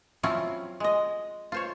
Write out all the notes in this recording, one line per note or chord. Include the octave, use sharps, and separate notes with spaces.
F3 F#3 C4 C#4 E4 F4
G#3 D#5
F4 C5 C#5